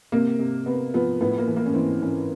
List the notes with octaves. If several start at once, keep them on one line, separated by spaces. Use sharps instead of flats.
C3 A#3
C3
C3 B3
F3 B3
A2 B3
A#3
E3
A#3
C#4
E3 C4
E3 C#4